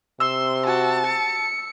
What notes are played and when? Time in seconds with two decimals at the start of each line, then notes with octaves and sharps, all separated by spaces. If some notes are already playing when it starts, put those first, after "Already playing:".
0.20 C3 C6 E6
0.65 F#4 A5
1.06 C#7